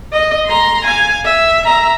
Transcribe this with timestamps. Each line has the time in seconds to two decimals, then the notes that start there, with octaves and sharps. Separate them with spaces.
0.13 D#5
0.47 A#5 C6
0.85 F5 G#5
1.25 E5
1.66 E5 A#5